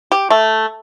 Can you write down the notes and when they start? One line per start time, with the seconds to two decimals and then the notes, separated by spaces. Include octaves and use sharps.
0.12 G4
0.30 A3